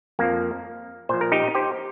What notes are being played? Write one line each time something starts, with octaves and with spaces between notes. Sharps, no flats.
F2 F3 A#3
A#2 F3 C5
A#4
D#4 G4
G4 C5